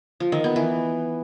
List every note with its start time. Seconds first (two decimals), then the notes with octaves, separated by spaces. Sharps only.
0.20 F3
0.32 D#3
0.44 B3
0.56 E3